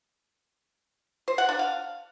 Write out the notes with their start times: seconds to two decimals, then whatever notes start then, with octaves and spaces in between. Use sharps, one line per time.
1.28 C5
1.38 F#5
1.49 D4
1.59 F5